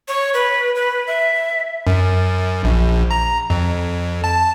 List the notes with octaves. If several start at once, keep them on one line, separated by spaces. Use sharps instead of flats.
C#5
B4
B4
E5
F#2
A#1
A#5
F2
A5